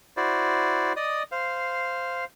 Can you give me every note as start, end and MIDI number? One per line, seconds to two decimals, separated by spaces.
0.17 0.93 64
0.17 0.93 66
0.17 0.93 72
0.17 0.93 74
0.96 1.23 74
0.96 1.23 75
0.96 1.23 87
1.32 2.25 72
1.32 2.25 77